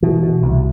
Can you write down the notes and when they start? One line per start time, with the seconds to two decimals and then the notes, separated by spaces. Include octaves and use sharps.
0.02 B2 E3
0.23 B2
0.42 C2